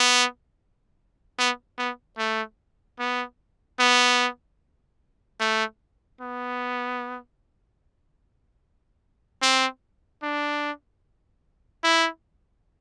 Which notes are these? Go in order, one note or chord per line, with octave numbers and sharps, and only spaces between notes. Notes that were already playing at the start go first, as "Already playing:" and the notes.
Already playing: B3
B3
B3
A3
B3
B3
A3
B3
C4
D4
E4